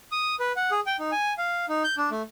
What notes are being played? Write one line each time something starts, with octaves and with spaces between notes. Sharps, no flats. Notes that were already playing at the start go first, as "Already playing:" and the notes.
D#6
B4
F#5
G#4
G5
D#4
G#5
F5
D#4
G6
D4
A3